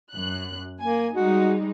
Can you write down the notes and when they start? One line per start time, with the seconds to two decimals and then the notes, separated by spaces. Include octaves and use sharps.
0.12 F#2 F#6
0.81 A#3 G#5
1.15 G3 G#3 D#4 F#4